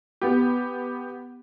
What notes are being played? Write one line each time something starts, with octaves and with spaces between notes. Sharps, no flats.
B3 G4